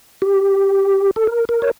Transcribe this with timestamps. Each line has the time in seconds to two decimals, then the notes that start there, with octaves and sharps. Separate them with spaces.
0.22 G4
1.16 A4
1.27 A#4
1.49 A#4
1.62 C#5